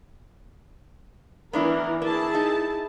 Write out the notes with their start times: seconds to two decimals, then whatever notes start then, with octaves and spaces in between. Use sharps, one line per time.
1.53 E3 B3 D4 E4 A#4
2.02 A#3 E4 G#4 A5
2.35 D#4